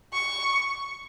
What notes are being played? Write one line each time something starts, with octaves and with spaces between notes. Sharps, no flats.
C#6